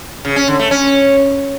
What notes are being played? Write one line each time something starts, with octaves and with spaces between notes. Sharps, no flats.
C#3
C#4
D3
A3
C#4